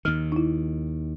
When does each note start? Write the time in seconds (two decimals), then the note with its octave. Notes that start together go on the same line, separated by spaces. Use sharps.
0.05 D#2 D#3 F6
0.32 D#4 E4